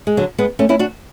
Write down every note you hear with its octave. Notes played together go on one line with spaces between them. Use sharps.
G#3
D3 F#3
G#3 B3
A3 C#4
C#4 E4
D4 F#4